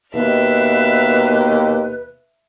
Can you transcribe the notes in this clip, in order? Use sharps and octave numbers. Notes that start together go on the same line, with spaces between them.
D#2 B2 B4 E5 F5